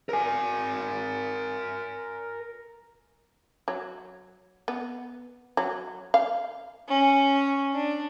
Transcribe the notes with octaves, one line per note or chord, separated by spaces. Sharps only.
A#4 G#5
F#3
B3
F#3
F5
C#4
D4